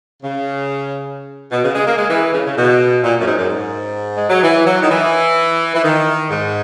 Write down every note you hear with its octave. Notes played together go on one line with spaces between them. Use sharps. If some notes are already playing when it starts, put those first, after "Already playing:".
C#3
B2
C#3
G#3
A#3
G#3
E3
C#3
C#3
B2
A#2
F#2
G#2
F#2
G#2
G#3
F#3
E3
F#3
D#3
E3
E3
D#3
G#2